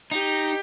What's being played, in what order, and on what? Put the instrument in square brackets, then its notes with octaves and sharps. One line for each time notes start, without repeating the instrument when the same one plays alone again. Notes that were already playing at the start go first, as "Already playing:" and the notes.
[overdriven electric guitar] D#4 [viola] G4